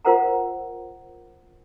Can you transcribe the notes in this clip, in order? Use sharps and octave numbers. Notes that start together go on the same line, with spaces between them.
F4 A#4 C5 F#5 A#5